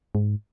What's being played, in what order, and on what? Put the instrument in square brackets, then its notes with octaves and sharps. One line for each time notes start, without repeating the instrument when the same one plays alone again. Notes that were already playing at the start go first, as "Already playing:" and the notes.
[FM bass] G#2